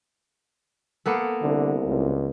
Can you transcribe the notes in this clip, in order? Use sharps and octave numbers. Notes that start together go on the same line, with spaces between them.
A#3 B3 A4
C2 D3
C#2